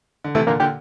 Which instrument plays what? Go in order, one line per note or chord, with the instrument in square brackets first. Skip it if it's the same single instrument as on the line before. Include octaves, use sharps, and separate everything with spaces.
[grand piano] D3
[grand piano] C3 E3 [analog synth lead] A3
[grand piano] A#2 D3 [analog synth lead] A#3
[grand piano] A#2 D3 [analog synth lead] G4